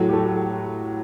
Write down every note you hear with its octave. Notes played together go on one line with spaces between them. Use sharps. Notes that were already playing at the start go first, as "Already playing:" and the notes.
Already playing: A2 F#3 A3 F#4
G4
A3 A4